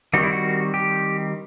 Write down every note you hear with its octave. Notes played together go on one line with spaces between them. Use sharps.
D#3 G3 C4 F#4
E4
F#4
G4